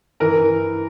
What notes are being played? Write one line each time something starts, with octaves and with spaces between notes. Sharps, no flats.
E3 A#4 A#5
E3